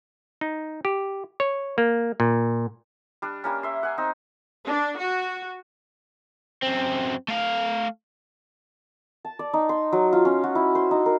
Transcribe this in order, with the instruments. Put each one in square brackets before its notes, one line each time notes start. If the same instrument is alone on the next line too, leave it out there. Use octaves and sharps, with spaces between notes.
[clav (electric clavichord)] D#4
G4
C#5
A#3
A#2
[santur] G3 D4
G3 A#3 C#4
E5 C6
F#5 G#5
C4 D#4
[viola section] D4
F#4
[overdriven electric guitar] F#2 C4
A3 F5
[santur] A5
D5
D#4
C6
F#3
F4
C#4
F#4
E4
C5
D#4
A#4